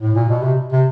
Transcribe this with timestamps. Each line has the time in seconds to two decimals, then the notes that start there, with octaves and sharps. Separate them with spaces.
0.01 A2
0.15 A#2
0.29 B2
0.43 C3
0.72 C3